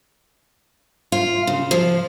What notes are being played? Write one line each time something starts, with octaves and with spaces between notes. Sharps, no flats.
F4
C#3
F3